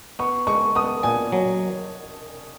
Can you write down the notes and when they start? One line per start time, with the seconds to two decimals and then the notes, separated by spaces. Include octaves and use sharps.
0.19 B3 C#6
0.47 G#3 C#6
0.75 B3 D#6
1.03 A#2 G#5
1.32 F#3